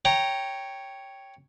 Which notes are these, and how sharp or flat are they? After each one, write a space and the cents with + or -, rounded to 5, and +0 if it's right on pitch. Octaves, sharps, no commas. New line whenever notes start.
C#5 +0 G5 +0 A#5 +0